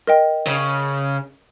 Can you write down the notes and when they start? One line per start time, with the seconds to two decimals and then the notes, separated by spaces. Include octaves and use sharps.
0.07 A#4 D#5 G5
0.47 C#3